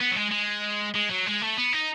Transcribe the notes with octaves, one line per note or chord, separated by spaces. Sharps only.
B3
F#3
G#3
G#3
G#3
F#3
G#3
A3
B3
D#4